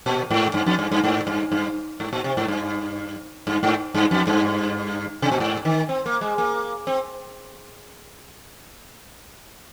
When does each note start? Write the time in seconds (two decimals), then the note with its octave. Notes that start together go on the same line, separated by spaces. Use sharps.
0.06 A#2
0.31 G#2
0.54 G2
0.67 F2
0.79 G2
0.91 G2
1.04 G#2
1.27 G2
1.52 G2
2.00 G#2
2.13 A#2
2.24 C3
2.37 G#2
2.48 G2
3.47 G2
3.63 G#2
3.94 G2
4.11 F2
4.27 G2
5.22 C3
5.32 A#2
5.40 G#2
5.65 D#3
5.89 C4
6.06 A#3
6.21 G#3
6.38 A#3
6.87 C4